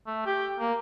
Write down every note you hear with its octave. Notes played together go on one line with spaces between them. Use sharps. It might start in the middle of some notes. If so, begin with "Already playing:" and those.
A3
G4
A#3